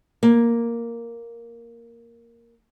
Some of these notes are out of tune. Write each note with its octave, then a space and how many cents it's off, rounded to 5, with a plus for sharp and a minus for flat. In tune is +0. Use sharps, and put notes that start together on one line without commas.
A#3 +0